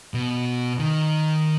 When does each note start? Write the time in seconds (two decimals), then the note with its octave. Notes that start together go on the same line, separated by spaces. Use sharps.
0.14 B2
0.79 D#3